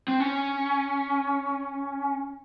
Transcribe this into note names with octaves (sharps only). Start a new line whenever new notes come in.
C4
C#4